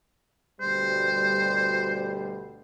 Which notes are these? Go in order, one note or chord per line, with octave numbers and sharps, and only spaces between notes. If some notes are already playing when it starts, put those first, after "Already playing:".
D2 B2 G3 C5